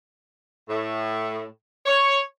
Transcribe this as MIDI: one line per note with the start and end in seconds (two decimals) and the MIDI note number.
0.69 1.43 45
1.86 2.19 73